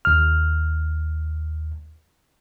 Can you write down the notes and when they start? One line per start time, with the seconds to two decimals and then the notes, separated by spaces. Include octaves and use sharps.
0.05 D#2 F6